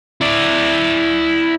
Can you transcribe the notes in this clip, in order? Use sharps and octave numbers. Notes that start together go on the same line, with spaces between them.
E4 D5